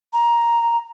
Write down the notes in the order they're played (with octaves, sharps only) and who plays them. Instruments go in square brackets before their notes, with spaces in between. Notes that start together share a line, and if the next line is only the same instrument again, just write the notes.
[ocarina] A#5